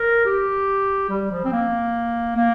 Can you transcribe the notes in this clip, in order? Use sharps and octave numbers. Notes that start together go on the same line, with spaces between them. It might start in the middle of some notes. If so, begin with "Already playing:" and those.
Already playing: A#4
G4
G3
F3
C4
A#3
A#3